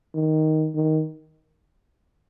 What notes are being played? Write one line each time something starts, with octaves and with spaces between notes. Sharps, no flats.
D#3
D#3